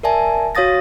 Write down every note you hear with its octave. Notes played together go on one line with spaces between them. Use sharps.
A#4 D5 E5 G#5 A5
F#4 C#5 F5 D#6 A6 A#6